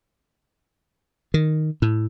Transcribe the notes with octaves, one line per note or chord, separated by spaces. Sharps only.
D#3
A2